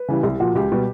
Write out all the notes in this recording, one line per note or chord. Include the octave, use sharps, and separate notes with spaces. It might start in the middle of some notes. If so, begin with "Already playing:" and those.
Already playing: B4
C#3 E3 G3
C2
A#2 F3 F#4
C#2 G4
B2 G3